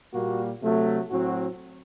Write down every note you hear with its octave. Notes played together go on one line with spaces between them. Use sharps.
A#2 G3 A#3 F#4
C3 F#3 A3
A2 F#3 C4 F#4